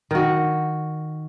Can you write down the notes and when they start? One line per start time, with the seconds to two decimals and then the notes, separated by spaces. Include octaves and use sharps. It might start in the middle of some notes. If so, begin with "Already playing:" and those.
0.11 D#3 F#4